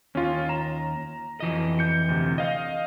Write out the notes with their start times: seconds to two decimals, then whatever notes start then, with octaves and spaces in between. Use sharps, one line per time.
0.15 D#2 C#4 F4
0.49 A#5 E7
1.40 F2 E3 D#5
1.79 G6 C#7
2.09 D2 C3
2.38 D#5 F5